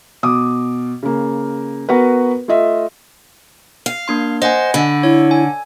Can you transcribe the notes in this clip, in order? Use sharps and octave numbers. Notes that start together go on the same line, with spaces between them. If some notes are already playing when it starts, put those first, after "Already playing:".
B2 D6 D#6
C#3 A#3
B3 F#4 A#4 B4
A3 F4 D#5 E5
F5
A#3 D4 C6
C5 D#5 F#5 G#5
D3 B5
E4 C#5
G#5